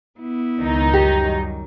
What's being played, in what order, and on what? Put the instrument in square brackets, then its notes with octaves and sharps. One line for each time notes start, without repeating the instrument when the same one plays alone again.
[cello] B3 E4
[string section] C#2 D#3 D#4
[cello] F#2 G3 [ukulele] G4